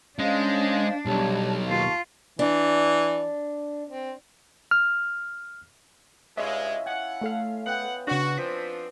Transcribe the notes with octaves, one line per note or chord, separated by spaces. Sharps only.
G#3 C#4 D4 C5 D#5 F5
B1 G3 C#5 D5 A5
D#2 F4 A5 C#6
E3 D4
C4
F6
G2 G#3 C#4 E4 F4 D#5 E5
F#5 G#5
A3 A4 F5
B3 F#5 G5
C#3 D4 F#4
F3 C4 D4 B6